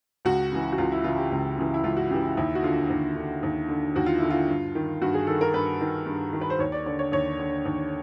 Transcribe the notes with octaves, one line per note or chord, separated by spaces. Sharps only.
C#2 F#4
C#3 E3
F#4
C#2 F4
E4
C#3 E3 F4
G4
C#2
C#3 E3
E4
C#2 F4
F#4
C#3 E3 G4
E4
D#2 E4
F#4
D3 F4
D#2
D3
D#2
D3
D#2 F#4
F4
D3 E4
F4
G2
D#3
G2 F#4
G#4
D#3 A4
A#4
G2 B4
D#3
G2
D#3
B4
C5
D#2 C#5
D5
D3 D5
C#5
D#2 C#5
D3
D#2